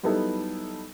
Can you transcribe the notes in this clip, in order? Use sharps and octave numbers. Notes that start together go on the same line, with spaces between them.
F#3 G3 B3 D#4 E4 A4